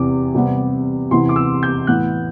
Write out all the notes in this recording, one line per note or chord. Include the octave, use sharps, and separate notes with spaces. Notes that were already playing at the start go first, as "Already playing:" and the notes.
Already playing: E2 C3 E3 D6
C3 G3 B3
C3 E3 B3 E4 C6
D6
E6
G6
A2 E3 B3 E4 F#6